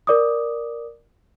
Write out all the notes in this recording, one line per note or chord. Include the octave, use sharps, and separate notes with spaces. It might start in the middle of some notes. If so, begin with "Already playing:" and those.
A#4 D5 D6 D#6